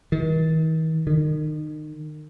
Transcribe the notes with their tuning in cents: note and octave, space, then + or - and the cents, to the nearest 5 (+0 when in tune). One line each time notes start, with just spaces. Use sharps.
D#3 +40
D#3 -30